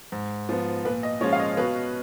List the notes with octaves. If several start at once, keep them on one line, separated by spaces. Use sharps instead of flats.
G#2
F3 B3
A#2 B4
D#5
F3 G#3 C#4 F4 C#5
F5
D#5
B2 B4